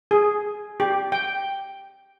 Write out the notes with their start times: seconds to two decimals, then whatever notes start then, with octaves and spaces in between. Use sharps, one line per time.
0.11 G#4
0.80 G4
1.12 G5